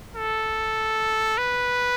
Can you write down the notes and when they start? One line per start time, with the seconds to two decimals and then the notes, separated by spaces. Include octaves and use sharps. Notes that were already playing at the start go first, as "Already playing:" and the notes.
0.15 A4
1.38 B4